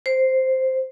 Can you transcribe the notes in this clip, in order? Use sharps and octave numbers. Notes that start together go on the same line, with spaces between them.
C5